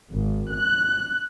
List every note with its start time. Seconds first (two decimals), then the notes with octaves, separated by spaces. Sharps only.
0.12 G#1
0.52 F#6